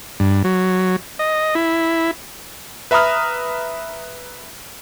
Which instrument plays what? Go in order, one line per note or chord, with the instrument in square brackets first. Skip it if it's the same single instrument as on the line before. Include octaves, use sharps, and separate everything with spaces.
[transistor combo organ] G2
F#3
D#5
E4
[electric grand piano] B4 E5 A#5 B5 D#6 F6